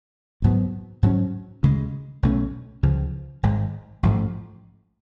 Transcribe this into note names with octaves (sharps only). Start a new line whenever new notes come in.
A1 G#2 F#3 B3
G#2 F#3 C#4
D2 C#3 G#3
B1 B2 A3 C#4
C#2 C#3 F3
G#1 G#2 G#3
A1 G#2 F3 A3